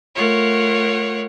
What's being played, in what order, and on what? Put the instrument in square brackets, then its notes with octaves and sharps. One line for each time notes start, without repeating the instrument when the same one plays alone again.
[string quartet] A3 F4 A#4 C#5 F#5